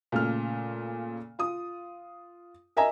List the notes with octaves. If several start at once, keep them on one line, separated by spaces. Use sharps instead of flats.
A#2 C#3 A3 F6
F4 D#6
A#4 D#5 E5 G#5 A#5